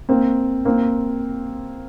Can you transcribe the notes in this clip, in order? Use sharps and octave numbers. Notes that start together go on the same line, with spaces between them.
A#3 C4
A#3 C4